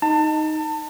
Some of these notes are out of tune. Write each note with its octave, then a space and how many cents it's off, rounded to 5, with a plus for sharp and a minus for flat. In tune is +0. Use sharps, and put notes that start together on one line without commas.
D#4 +0 A5 +30